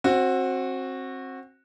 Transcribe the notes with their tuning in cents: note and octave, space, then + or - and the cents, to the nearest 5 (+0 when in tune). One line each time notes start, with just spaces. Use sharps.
C4 +25 F#4 -10